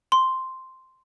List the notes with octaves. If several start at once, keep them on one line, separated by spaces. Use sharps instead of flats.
C6